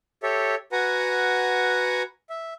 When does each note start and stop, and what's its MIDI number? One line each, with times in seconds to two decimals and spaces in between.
0.23 0.55 67
0.23 0.55 69
0.23 0.55 73
0.23 0.55 76
0.72 2.03 66
0.72 2.03 71
0.72 2.03 78
0.72 2.03 80
0.72 2.03 82
2.30 2.54 76